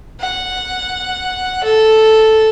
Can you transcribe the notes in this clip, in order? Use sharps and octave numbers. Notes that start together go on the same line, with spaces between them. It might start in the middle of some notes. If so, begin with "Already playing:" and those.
F#5
A4